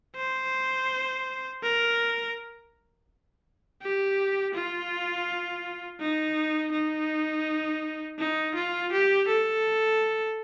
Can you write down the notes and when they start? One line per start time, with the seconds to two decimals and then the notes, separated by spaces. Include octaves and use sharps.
0.16 C5
1.63 A#4
3.82 G4
4.54 F4
6.00 D#4
6.72 D#4
8.19 D#4
8.55 F4
8.92 G4
9.28 A4